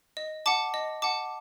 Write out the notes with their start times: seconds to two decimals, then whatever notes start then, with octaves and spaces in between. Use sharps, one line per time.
0.17 D#5
0.46 F#5 A5 D6
0.74 D#5
1.02 F#5 A5 D6